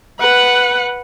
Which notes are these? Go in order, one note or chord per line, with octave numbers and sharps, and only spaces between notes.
B4 F#5